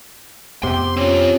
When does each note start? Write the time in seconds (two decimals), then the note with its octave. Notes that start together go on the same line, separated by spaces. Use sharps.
0.63 F2 C3 B3 G4 C6
0.97 C4 C#4 F4